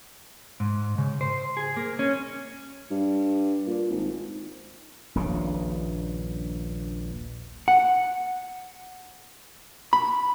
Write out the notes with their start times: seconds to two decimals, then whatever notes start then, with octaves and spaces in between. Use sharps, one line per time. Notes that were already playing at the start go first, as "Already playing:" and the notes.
0.60 G#2
0.98 C#3
1.21 C5
1.57 G#4
1.77 A#3
1.99 C#4
2.90 G2
3.67 A#2
3.91 G#1
5.15 D#1 A#1 G2 C#3
7.68 F#5
9.93 B5